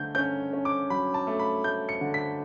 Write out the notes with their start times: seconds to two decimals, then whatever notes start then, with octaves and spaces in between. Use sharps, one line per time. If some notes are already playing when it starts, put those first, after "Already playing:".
Already playing: D3 A3 G6
0.15 C#4 G6
0.53 C#4
0.65 D6
0.90 F#3 B5
1.14 A5
1.27 A3
1.39 B5
1.64 A3 G6
1.89 C#7
2.01 D3
2.14 B6